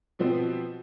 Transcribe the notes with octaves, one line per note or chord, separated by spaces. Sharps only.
B2 F3 B3 C4